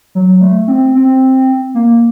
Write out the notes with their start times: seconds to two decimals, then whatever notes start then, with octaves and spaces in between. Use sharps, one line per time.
0.15 F#3
0.41 A3
0.68 C4
0.95 C4
1.75 A#3